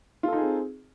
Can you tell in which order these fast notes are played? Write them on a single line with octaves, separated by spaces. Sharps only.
F4 A4 D#4 G#4 C4